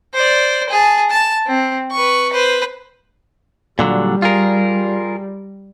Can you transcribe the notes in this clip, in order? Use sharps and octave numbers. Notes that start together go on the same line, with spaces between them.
C5 D5
G#4 A5
A5
C4
B4 C#6
B4 C5
A#2 D3 F#3 G3
F4 G#4 A#4